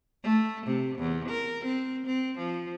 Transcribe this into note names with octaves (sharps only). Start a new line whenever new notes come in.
A3
C3
E2
A#4
C4
C4
F3